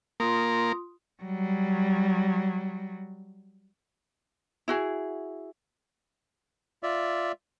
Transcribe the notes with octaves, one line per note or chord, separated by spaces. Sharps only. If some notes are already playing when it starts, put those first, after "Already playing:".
A#3 F4 C6 D#6
F#3 G3
E4 F#4 G#4
F4 D5 E5